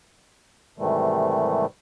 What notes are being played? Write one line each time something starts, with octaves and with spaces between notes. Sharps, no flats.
G#2 C3 D#3 E3 G3 A3